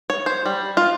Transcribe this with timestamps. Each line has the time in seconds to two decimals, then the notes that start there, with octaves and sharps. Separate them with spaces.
0.10 C#5
0.26 C5
0.46 G3
0.77 F4